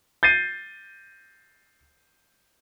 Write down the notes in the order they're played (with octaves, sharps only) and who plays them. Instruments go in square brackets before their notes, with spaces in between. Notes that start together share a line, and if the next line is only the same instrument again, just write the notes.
[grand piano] G6 A6 C7 D#7